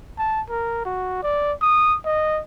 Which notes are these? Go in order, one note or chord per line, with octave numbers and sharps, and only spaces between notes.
A5
A#4
F#4
D5
D#6
D#5